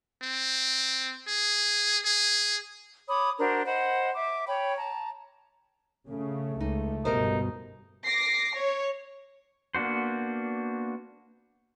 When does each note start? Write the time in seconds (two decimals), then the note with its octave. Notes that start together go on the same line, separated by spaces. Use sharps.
0.22 C4
1.27 G#4
2.05 G#4
3.08 C#5 B5 D6 D#6
3.39 D4 F#4 A#4 C5
3.66 C5 D#5 F#5 B5
4.14 E5 D6
4.46 C#5 G5 B5
4.76 A5 A#5
6.09 C#3 A3
6.60 C#2 D#4
7.05 G1 B2 D#4 G4 A#4 C5
8.06 D6 A#6 C7
8.53 C#5
9.75 A#3 B3 D4 F#4 C5